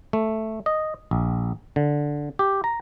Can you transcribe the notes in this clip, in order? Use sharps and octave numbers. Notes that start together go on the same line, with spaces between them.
A3
D#5
A#1
D3
G4
A#5